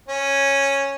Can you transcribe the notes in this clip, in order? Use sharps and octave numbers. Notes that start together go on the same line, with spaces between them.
C#4